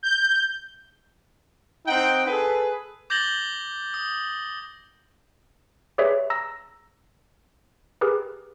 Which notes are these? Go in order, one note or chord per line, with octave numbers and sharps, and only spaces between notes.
G6
C4 D#4 F#5 G5
G#4 A4 B4
D6 G6 A6 A#6 F#7 G7
D#6
G4 G#4 B4 C#5 D5 E5
A#5 E6 A#6
G4 G#4 A#4 B4